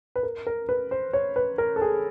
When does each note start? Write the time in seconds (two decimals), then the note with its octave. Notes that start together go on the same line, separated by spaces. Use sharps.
0.16 B4
0.23 A#4
0.47 A#4
0.69 B4
0.91 C5
1.13 C#5
1.36 B4
1.58 A#4
1.76 A4
1.82 G#4